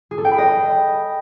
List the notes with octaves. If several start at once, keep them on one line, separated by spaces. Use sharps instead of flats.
G#4
A4
G5
B5
D#5